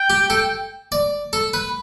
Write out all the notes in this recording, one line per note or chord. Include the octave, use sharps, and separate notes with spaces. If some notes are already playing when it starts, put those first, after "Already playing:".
Already playing: G5
G4
A4
D5
A4
B4